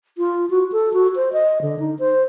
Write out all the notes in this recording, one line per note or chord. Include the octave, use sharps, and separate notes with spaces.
F4
F#4
A4
F#4
C5
D#5
D3
D#4
C5